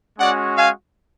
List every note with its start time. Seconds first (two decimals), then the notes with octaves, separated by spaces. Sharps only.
0.18 G#3 C#4 F#4 D5 F#5
0.56 F5 G#5